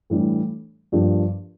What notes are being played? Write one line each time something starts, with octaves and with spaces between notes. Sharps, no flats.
A2 E3 G3 D4
G2 F3 A#3 D4 G4